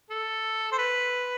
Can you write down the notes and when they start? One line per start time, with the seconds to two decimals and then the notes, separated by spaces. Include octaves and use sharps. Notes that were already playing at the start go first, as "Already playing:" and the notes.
0.10 A4
0.72 C5
0.79 B4